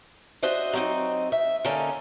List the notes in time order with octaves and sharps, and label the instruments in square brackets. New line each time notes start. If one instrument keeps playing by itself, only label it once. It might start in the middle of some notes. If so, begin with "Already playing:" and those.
[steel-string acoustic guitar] D4 F#4 C5 D#5 E5
F#3 C4 D#4
E5
D3 A#3 C#4 D#4 A4